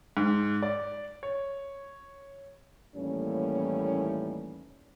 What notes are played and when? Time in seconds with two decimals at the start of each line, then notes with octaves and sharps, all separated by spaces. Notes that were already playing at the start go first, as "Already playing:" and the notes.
0.17 G#2
0.63 D5
1.23 C#5
2.96 D#2 A2 E3 G3 A#3 C#4